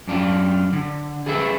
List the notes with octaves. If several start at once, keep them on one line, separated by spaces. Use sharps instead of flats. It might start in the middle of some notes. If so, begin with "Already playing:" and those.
F#2 D4 F4
D3
G#4 A4 B4 E5